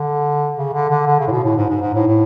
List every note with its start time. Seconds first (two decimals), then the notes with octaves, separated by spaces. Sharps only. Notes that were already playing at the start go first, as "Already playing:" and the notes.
Already playing: D3
0.56 C#3
0.73 D3
0.89 D3
1.07 D3
1.19 C#3
1.27 A2
1.31 B2
1.44 A2
1.57 G#2
1.69 G#2
1.81 G#2
1.94 A2
2.07 A2